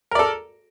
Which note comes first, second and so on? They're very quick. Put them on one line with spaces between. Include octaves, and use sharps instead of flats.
A#4 D5 A4